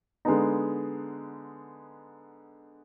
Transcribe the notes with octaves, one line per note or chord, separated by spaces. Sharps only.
D3 G#3 B3 D#4